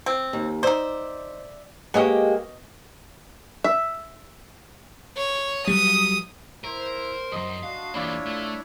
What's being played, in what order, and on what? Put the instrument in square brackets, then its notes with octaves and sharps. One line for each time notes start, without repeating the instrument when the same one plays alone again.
[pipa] C4
[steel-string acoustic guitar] D#2
[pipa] D#4 C5 [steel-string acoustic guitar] D5 E5
[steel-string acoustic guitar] G#3 A#3 G4 [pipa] B3 C#5 D#5
[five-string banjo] E5
[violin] C#5
[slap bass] F#3 G3 [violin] D#6
[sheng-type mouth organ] E4 [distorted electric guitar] A#4 [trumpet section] C5
[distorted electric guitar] C2 F#2 [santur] D#5 D#6 [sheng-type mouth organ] C6
[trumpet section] D4 F#4 [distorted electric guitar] F5
[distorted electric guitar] E2 A#3 [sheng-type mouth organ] D4 E4 C#5 [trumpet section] F4 [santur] D5 B5
[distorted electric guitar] A3